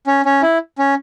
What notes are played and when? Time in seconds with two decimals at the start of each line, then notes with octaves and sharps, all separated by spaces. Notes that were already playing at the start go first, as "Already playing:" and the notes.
0.07 C#4
0.25 C#4
0.42 E4
0.78 C#4